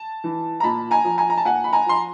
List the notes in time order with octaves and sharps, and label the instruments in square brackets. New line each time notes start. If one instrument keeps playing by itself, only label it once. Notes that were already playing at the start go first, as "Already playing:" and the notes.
Already playing: [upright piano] A5
E3
A#5
A#2 A5 B5
G#5 A#5
F3
G#5 A#5
A#5
A5
A#2 F#5 G#5
B5
G#5 A#5
F3 C6